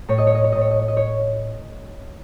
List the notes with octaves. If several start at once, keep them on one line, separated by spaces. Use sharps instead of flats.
A2 C#5
D#5
C#5
D#5
C#5
A2 D#5
C#5
D#5
C#5
D#5
C#5